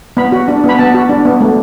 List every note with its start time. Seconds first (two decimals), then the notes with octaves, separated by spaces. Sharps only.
0.17 B3 B5
0.32 F#4
0.48 D4
0.64 B3
0.69 B5
0.79 B3 A5
0.94 F#4
1.09 D4
1.25 B3
1.41 A3